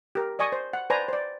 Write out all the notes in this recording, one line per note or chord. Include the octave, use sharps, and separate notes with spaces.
G4 A#4
D5 D#5 G#5 C#6 D#6
C5
F#5
B4 C5 D5 G#5 A#5
C5 D5